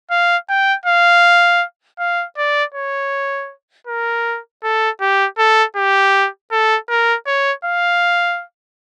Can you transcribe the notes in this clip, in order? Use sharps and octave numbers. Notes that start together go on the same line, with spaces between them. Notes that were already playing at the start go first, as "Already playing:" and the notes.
F5
G5
F5
F5
D5
C#5
A#4
A4
G4
A4
G4
A4
A#4
C#5
F5